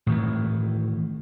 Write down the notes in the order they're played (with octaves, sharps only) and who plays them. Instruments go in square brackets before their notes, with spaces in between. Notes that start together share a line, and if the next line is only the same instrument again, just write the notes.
[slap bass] A2 D#3 E3